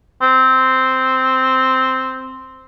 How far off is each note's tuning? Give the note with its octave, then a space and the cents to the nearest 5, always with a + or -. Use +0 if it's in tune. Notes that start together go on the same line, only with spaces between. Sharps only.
C4 -5